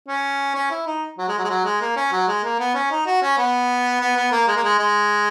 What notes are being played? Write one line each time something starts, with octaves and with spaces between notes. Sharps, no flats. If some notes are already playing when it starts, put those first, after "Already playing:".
C#4
C#4
E4
D#4
F#3
G#3
F#3
G#3
F#3
G#3
A#3
C#4
F#3
G#3
A#3
B3
C#4
D#4
F#4
C#4
B3
B3
B3
A#3
G#3
A#3
G#3
G#3